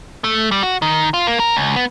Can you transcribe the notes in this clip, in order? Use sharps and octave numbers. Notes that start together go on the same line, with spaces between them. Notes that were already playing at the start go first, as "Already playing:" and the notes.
A3
G3
F#4
D#3
F4
A#3
A#4
C#2
B3